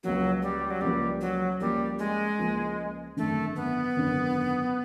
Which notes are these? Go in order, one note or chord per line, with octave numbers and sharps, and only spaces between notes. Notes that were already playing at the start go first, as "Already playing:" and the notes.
C#2 C#3 F3 F#3 A#3
G3
F#3
C#2 C#3 F3 G3 A#3
F#3
C#2 C#3 F3 G3 A#3
G#3
C#2 C#3 F3 A#3
G#1 F#2 D3 A3
B3
G#1 F#2 D3